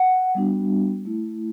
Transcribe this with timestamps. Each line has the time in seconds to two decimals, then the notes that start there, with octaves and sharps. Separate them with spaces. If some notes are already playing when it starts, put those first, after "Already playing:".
Already playing: F#5
0.35 G3 B3 D4 F#4
1.05 A3 E4